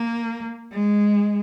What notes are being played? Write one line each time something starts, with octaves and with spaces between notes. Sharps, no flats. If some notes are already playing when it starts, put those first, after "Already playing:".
Already playing: A#3
G#3